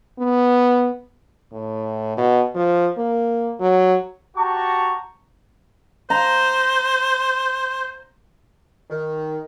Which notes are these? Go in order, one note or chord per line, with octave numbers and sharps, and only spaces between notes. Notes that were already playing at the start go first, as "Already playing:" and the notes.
B3
A2
B2
F3
A#3
F#3
F#4 G4 A5 A#5 C#6
C5 A#5
D#3